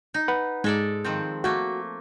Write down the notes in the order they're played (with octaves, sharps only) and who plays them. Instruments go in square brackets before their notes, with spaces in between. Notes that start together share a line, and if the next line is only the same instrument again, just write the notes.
[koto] D#4
[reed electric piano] B4 F#5 B5
[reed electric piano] G#2 [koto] G#3 A4 D5
[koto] D#3 F3 C4
[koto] A3 A#3 [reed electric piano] F#4